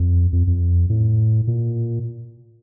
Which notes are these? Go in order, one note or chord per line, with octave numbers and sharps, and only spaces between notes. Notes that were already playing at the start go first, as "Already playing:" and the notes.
Already playing: F2
F2
F2
A2
A#2